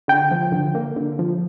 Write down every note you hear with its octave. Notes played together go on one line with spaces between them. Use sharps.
D3 G5
F3
D3
A#3
D3
F3